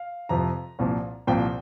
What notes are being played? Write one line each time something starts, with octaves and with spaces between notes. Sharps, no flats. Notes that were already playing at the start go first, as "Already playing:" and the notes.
Already playing: F5
F2 C3 F3 A#5
C2 A#2 F3
C2 A#2 F3 G5